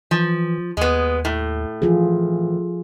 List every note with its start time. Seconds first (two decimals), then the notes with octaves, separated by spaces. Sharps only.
0.11 E3 F3
0.77 D#2 G#3 B3
1.25 A2
1.82 E3 F3 F4 G#4